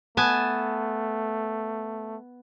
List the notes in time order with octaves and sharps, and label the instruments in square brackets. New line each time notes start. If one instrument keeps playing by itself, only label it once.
[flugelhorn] A3 [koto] B3 G#5 A5